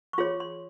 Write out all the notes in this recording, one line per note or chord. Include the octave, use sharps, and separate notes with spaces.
C#6
F4 G#4 C#5 C6
C6